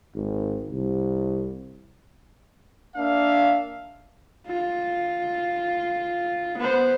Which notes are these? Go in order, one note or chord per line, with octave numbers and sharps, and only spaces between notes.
G#1
C2
A#3 D4 E5 F5
F4
B3 C5